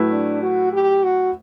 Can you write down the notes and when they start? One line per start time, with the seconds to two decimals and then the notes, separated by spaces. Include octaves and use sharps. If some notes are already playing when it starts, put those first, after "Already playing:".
Already playing: A2 F#3 A3 E4 B4
0.11 D4
0.42 F#4
0.73 G4
1.04 F#4